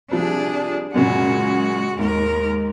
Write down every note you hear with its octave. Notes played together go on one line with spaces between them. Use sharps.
C2 F3 D4 G#4
F#2 A#2 C#3 G#3 F#4
D#2 G#2 A#4